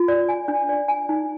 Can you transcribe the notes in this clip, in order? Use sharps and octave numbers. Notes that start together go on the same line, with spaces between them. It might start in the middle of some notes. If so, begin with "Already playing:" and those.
Already playing: F4
D5
G#5
D4
D5
G#5
D#4